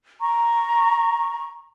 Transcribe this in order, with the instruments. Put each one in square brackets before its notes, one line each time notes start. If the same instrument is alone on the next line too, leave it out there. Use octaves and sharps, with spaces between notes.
[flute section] A#5 C#6